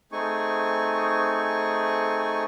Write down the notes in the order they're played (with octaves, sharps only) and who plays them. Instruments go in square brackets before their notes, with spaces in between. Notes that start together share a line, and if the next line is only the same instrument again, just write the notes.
[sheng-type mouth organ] A3 C4 D#4 G#4 G#5 C#6